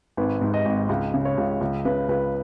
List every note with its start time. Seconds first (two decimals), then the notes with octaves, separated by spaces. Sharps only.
0.17 G#1 B4
0.41 G#2
0.54 D#5
0.66 G#1
0.89 C#2
1.14 C#3
1.25 C#5
1.38 C#2
1.61 C#2
1.85 C#3 B4
2.09 C#2 B4